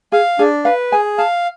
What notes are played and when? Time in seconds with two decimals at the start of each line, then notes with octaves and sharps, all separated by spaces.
0.12 G#4 F5
0.39 D4 G#4
0.65 B4 F5
0.92 G#4 G#5
1.18 F5 A5